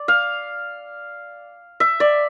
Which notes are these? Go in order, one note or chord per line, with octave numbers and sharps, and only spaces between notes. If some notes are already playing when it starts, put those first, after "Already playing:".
Already playing: D5
F5
E5
D5